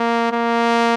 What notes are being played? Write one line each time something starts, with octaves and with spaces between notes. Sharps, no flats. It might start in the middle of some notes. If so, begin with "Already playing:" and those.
Already playing: A#3
A#3